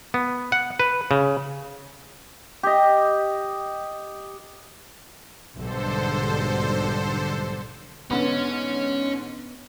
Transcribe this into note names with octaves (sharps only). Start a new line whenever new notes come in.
B3
F#5
B4
C#3
G4 D#5
B1 G#2 D3 G3 A4 C5
G#2 D3 B3 C#4